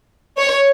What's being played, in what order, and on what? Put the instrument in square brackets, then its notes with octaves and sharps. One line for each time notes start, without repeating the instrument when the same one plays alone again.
[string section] C#5